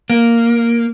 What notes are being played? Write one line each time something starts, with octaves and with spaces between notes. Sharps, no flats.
A#3